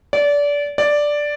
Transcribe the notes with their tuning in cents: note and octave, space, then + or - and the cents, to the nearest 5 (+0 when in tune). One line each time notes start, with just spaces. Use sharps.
D5 -25
D5 +0